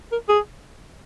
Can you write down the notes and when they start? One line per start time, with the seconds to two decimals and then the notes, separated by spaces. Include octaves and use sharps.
0.12 A#4
0.29 G#4